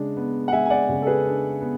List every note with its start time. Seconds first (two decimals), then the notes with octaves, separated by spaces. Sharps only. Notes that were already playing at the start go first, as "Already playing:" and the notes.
Already playing: C#3 G#3 D4
0.17 B3
0.48 F#5
0.52 G#3 E5 G#5
0.66 G#5
0.70 D5 F#5
0.89 C#3
1.02 A4
1.07 G#4 B4
1.26 D4
1.61 B3